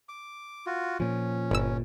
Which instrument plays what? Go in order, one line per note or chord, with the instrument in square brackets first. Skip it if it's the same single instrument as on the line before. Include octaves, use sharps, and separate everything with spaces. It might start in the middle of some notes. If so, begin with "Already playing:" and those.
[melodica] D6
F4 F#4
[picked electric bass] A#2 F3 [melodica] C#4
[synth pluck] G1 E6 [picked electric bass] A#2